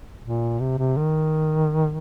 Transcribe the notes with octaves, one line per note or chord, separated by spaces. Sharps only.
A#2
C3
C3
D#3